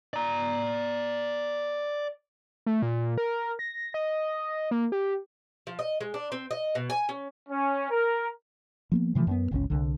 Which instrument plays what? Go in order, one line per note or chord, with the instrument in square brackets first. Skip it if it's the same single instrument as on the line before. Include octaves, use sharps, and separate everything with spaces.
[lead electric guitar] D5 A#5
[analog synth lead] A3
A#2
A#4
A#6
D#5
A#3
G4
[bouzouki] F3
D#5
G#3
D4
C4
D#5
B2
G#5
C#4
[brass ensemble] C#4
A#4
[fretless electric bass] F3 A#3 B3
C3 E3 F3 A3
F#2 A#3 B3
G1 C#2 D3 C#4
C2 D3